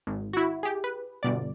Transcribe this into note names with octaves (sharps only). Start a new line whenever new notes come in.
G#1
E4 F#4
G4 G#4
B4
G1 B2 D5